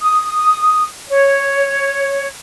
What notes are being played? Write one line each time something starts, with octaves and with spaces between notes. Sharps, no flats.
D#6
C#5